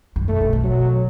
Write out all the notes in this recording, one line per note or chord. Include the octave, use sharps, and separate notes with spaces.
F#2
B2 A3
B2
B2
F#3